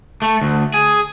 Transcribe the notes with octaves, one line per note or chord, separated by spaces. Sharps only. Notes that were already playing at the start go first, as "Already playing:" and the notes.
A3
D2
G#4